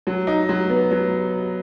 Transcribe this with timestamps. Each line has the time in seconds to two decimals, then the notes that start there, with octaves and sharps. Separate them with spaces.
0.07 F#3
0.27 D#4
0.49 F#3
0.69 B3
0.91 F#3